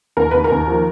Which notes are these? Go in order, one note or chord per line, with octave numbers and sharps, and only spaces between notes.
D#2 A#4
D#2 B4
A#4
D#2
F3